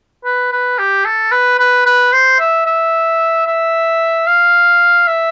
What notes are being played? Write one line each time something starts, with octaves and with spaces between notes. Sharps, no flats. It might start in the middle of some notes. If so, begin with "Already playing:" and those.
B4
B4
G4
A4
B4
B4
B4
C5
E5
E5
E5
F5
E5